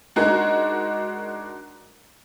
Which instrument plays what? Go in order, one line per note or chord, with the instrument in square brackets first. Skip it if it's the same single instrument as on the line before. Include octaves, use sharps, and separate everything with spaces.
[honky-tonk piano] G#3 D4 D#4 F#4 A#4